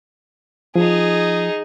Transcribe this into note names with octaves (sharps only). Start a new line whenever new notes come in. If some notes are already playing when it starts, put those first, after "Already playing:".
F3 D#4 G#4